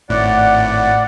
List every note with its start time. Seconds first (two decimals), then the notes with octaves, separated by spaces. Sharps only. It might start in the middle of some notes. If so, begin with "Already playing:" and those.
0.10 G#1 A2 D5 F#5